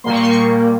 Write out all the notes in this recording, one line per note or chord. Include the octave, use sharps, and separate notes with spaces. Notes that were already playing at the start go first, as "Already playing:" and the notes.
A#2 G3 A#3 C6
C#6
C6
C#6